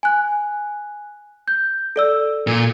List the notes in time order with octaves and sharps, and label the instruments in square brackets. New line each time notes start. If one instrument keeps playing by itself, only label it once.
[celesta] G#5 F#6
G6
A4 D5 E6
[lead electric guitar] A#2